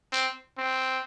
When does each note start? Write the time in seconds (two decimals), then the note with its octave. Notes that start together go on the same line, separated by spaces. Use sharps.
0.13 C4
0.58 C4